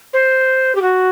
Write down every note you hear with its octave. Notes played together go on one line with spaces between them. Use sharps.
C5
G4
F#4